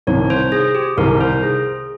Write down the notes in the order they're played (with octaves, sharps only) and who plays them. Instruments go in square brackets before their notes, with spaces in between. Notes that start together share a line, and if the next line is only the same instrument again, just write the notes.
[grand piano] C2 C3 D#3 [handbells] C#5
[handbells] C5
G#4
G4
[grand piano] C2 C3 D#3 [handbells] A#4
[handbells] C5
G#4